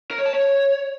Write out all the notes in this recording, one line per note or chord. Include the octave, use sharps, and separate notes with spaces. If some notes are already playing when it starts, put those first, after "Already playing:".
A#4
C#5
A5
C#5